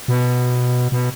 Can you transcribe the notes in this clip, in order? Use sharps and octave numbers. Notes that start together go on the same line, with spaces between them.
B2
B2